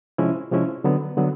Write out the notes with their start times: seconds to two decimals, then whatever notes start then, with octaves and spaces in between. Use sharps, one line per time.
0.18 C3 F3 G#3 C#4 E4
0.51 C3 F3 G#3 C#4 E4
0.84 D3 F#3 B3
1.17 D3 F#3 B3